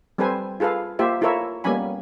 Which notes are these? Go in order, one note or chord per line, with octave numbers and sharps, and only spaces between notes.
G3 C4 A4 B4 C5 G#5
F4 G#4 A4 B4 F5
A#3 F4 G4 C5 E5
E4 F4 A4 A#4 C#5 E5
G3 A#3 B3 C#4 G#5 B5